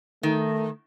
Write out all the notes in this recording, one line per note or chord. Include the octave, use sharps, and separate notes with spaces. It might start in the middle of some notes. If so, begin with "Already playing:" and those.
D#3 A3